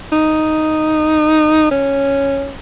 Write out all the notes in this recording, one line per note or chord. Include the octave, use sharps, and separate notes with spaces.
D#4
C#4